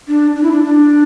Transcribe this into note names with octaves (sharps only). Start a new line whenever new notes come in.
D4
D4
E4
D4
D4